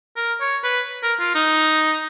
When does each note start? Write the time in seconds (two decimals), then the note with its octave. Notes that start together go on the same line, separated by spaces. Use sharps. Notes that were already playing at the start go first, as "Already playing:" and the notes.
0.16 A#4
0.41 C#5
0.64 B4
1.03 A#4
1.20 F4
1.35 D#4